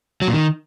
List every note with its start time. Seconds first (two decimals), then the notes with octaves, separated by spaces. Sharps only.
0.22 F#3
0.27 A#2
0.33 D#3